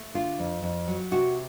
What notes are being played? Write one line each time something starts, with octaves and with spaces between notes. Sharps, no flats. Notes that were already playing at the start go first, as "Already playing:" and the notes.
Already playing: A3
D3 F4
F2
F2
F#3
C3 F#4